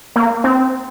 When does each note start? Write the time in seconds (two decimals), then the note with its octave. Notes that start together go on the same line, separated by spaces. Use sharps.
0.16 A#3
0.44 C4